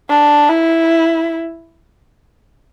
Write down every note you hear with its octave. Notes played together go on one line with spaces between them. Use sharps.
D4
E4